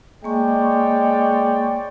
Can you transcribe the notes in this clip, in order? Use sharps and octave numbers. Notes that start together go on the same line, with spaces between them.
G#3 A#3 C#5 D5 G5 C#6